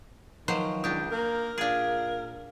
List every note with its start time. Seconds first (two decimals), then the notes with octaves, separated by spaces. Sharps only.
0.48 D#3 F3 F#3 B4 C5
0.84 C#2 D4 G4 D#6 G6
1.11 A#3 A#4
1.58 A#2 D4 G#4 F5 G#6 D7